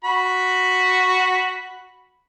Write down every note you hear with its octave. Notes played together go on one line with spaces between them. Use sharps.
F#4 B5